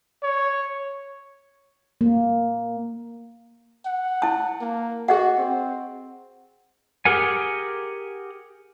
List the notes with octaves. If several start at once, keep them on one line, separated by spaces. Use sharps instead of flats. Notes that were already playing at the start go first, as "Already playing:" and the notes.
C#5
A#3
F#5
E4 A5
A#3
F#4 G#4 D#5 F#5
C4
G4 G#4 A#4 F#5 G#5